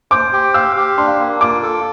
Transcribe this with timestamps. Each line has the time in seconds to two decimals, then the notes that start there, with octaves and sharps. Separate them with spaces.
0.11 C5 D6
0.33 G4
0.54 F5 E6
0.76 G4
0.98 D4 C6
1.19 A#3
1.41 F4 D6
1.63 A4